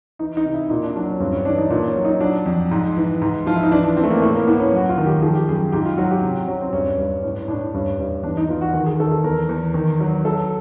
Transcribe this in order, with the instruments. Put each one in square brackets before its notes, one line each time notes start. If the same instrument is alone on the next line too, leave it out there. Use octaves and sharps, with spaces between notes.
[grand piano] E3 D#4
D#4
C3
E4
A#2 D#4
D4
F#3 D4
C#4
G2 C4
C#4
E3 D4
D#4
A#2 D4
C#4
F#3
D#4
F#3 D4
F2
G#2
E3
G#2
F3 F4
E4
D#4
E3 D4
D4
E3 C4
A3
A#3
A2 A3
A#3
A2 B3
C#4
F#2 F#4
F4
D#3
G4
F3 G#4
G4
F#2 G#4
G#2 G4
F4
F#3 F#4
G4
C3
F#4
F#3 C#4
C4
G2 C#4
G2
A2 C#4
A2 D4
G2 C#4
G2
E2 D4
D#4
E2 F4
F#4
D#3 F#4
G#4
D#3 A4
A4
E2 A#4
E2
D#3
F#3
F#3 A4